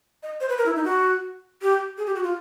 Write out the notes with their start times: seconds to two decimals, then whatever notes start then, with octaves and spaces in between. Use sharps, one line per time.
0.23 D#5
0.40 C5
0.49 B4
0.58 A#4
0.66 E4
0.76 D#4
0.84 F#4
1.62 G4
1.98 G#4
2.06 G4
2.15 F#4
2.24 F4